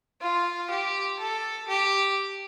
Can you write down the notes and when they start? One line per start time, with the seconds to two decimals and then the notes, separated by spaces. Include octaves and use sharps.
0.21 F4
0.70 G4
1.20 A4
1.68 G4